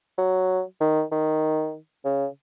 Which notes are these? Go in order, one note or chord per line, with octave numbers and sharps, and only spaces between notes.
F#3
D#3
D#3
C#3